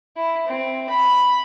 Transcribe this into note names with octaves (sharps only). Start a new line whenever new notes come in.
E4
C4
B5